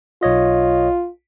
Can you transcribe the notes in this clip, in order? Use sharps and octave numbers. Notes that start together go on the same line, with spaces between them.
B1 F4 C#5 D#5